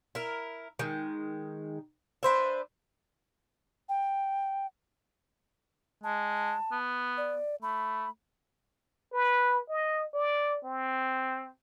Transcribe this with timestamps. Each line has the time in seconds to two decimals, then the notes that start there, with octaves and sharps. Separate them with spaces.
0.15 E4 A#4
0.79 D#3 G#3
2.23 D4 B4 C5 E5
3.89 G5
6.04 G#3 A5
6.72 B3
7.18 D5
7.62 A3 B5
9.13 B4
9.69 D#5
10.14 D5
10.65 C4